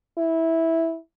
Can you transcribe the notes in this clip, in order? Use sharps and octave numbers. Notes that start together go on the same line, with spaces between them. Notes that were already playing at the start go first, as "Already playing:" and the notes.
E4